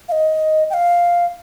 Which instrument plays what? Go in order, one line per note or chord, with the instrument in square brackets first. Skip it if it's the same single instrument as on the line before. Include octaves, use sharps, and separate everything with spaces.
[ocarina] F5
D#5
G5
F5